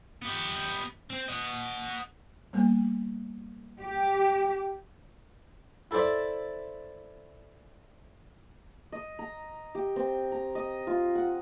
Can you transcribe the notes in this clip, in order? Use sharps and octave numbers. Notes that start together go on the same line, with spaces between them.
B3 G4
C4
D#5 F#5
G3 A#3 B3
G4
E4 A4 C5 D5 E5
D#5
A#5
G4
C4
A#5
D#5
F4
F#5